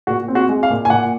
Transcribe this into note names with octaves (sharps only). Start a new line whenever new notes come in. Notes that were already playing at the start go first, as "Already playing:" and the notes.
A#2 F#4
C4
F#4
G#3
F5
A#2
G#5
A#2 F#5